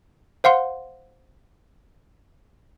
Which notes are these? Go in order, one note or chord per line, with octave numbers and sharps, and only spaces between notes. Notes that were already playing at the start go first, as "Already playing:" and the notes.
C5 F5 F#5 C6